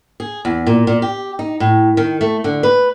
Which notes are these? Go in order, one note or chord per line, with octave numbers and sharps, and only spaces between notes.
G#4
E2
A#2
A#2
G4
D#4
A2
D#3
A3
D3
B4